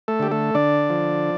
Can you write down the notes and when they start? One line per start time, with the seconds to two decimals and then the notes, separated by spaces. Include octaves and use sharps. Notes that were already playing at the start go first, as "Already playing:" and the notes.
0.08 A3 A4
0.20 D3 G4
0.31 A3 A4
0.55 D3 D4 D5
0.90 F3